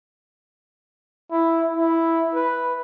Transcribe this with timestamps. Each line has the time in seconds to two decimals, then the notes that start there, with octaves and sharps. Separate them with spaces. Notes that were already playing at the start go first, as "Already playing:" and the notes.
1.31 E4
1.77 E4
2.35 B4